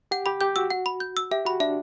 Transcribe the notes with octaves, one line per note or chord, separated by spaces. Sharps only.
G4 F#5
G4 B5
G4 G6
F#4 E6
F#5
B5
G6
E6
G4 E5
F#4 B5
D4 E5